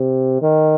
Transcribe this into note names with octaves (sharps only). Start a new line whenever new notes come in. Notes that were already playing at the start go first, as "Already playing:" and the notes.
Already playing: C3
D#3